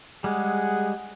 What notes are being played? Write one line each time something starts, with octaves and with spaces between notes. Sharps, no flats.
G3 G#3 G#4 F#5